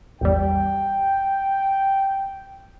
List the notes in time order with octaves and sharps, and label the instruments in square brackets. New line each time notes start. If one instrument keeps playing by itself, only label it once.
[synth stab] A1 E2 G3 [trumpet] G5